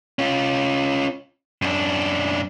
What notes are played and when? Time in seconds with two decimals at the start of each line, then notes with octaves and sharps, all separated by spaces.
0.19 C#4 F4
1.62 F#2 D4